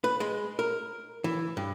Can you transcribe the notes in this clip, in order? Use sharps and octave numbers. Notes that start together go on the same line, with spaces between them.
B4
G#3
A#4
E3
G2